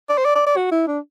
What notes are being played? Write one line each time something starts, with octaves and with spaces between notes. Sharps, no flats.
D5
C5
D5
D5
D5
F#4
E4
D4